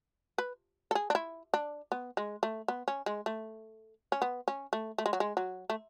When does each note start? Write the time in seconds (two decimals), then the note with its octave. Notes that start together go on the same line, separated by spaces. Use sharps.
0.38 B4
0.91 A4
0.95 G#4
1.10 D4
1.15 E4
1.54 D4
1.92 B3
2.17 G#3
2.43 A3
2.68 B3
2.88 C#4
3.06 G#3
3.26 A3
4.12 C#4
4.22 B3
4.48 C#4
4.73 A3
4.98 A3
5.06 G#3
5.13 F#3
5.20 G#3
5.37 F#3
5.70 A3